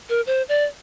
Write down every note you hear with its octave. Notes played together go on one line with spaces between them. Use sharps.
A#4
C5
D5